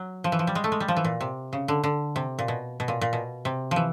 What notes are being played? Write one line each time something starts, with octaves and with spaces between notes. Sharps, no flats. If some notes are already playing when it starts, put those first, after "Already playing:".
Already playing: F#3
F3
E3
F3
G3
G#3
A3
G#3
G3
F3
E3
A#2
C3
C#3
D3
D3
C3
A#2
B2
B2
A#2
A#2
B2
C3
F3
E3